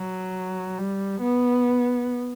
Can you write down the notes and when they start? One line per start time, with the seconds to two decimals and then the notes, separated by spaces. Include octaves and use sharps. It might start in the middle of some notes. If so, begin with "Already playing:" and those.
Already playing: F#3
0.79 G3
1.21 B3